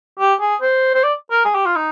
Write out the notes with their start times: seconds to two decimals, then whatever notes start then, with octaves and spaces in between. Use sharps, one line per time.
0.20 G4
0.41 G#4
0.62 C5
0.94 C5
1.04 D5
1.31 A#4
1.45 G#4
1.55 G4
1.66 F4
1.76 D#4